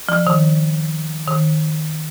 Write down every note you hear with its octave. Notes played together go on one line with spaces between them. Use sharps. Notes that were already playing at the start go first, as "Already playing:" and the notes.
F3
D#3
D#3